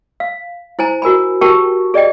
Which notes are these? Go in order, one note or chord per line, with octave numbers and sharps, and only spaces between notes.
F5
E4 C5 G#5 A#5
F#4 A#4 G#5 B5
F#4 G4 A#4 G5 A5 C#6
G#4 D5 D#5 G5